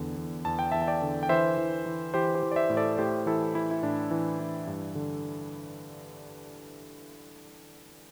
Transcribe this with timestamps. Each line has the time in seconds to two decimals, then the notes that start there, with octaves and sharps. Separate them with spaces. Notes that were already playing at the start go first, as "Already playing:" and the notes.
Already playing: E2 D3
0.17 E2
0.45 E2 A5
0.59 G5
0.72 E2 E5 A5
0.82 A5
0.87 D5 G5
1.02 D3
1.23 G5
1.29 E3 C5 E5
1.58 E3
1.86 E3
2.14 E3 G4 C5
2.35 G4 C5
2.43 E3
2.52 D5
2.56 C5 E5
2.70 A2
2.77 A4 D5
2.98 A2 G4 C5
3.26 E3 E4 A4
3.55 E3 E4
3.71 E4
3.83 A2 D4
4.11 E3
4.40 E3
4.67 G2
4.95 D3